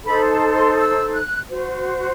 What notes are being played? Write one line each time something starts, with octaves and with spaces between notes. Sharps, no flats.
D#4 A4 C5 B5
A5
C6
E6
F#6
F#4 C5